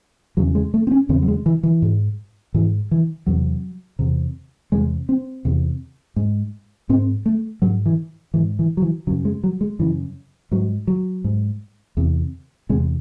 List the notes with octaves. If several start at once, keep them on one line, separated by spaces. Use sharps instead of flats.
E2 C#3 F#3
G#3
A3
C4
C#4
E2 C#3 C4
F#3
G#3
E3
E3
G#2
G#2 E3
E3
E2 C3 F#3
E2 C3
E2 C3 G#3
C4
E2 C3
G#2
G#2 C4
A3
G#2 F#3
E3
G#2 E3
E3
F#3
E3
F#2 C#3 F#3
G#3
F#3
G#3
F#2 C#3 E3
G#2 F#3
F#3
G#2
E2 C3
E2 C3 G#3